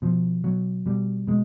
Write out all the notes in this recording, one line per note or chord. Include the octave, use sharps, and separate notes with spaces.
B2 F3
B2 F#3
B2 G3
B2 G#3